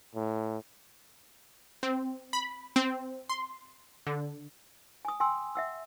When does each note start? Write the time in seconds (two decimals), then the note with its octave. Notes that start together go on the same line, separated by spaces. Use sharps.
0.15 A2
1.83 C4
2.33 B5
2.76 C4
3.29 C6
4.07 D3
5.05 G#5 D#6
5.20 G5 G#5 C6 E6
5.55 E5 F#5 E6